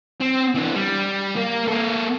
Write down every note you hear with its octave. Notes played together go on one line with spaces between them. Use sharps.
C4
E3 D4
G3
A#3 A#4
A#3 A4